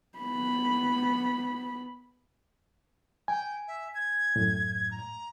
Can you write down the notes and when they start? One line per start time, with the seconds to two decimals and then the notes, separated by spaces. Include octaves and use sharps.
0.19 B3 B5
3.28 G5 G#5
3.68 E5
3.95 G#6
4.36 F#2 A2
4.91 A#5